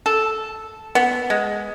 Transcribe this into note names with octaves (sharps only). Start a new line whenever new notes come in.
A4
B3
G#3